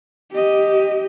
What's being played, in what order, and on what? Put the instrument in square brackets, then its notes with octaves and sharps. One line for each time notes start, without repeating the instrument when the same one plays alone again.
[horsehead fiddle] G4 D#5